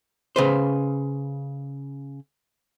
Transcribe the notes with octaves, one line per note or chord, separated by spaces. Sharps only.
C#3 B4 C5